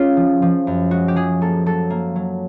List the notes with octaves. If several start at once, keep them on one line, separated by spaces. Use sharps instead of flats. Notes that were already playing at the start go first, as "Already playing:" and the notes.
Already playing: G#3 C#4 F4
F3
F3
F#2
G#3 F#4
G4
F3 G#4
A#3 A4
F#3 A4
A#3
F#3